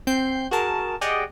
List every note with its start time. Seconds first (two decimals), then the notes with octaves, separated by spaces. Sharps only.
0.07 C4 G6 C7
0.51 F#4 G#4 A#4 A5
1.01 G4 G#4 D5 D#5 F#5 G5